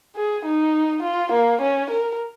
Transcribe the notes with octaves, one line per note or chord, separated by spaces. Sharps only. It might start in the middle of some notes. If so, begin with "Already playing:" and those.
G#4
D#4
F4
A#3
C#4
A#4